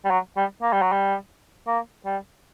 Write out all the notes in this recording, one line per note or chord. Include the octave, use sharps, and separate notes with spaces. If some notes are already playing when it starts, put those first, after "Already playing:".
G3
F#3
G3
A#3
G3
F#3
G3
A#3
G3